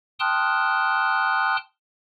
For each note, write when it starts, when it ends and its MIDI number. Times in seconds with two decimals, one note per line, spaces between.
0.20 1.57 79
0.20 1.57 81
0.20 1.57 84
0.20 1.57 87
0.20 1.57 89
0.20 1.57 90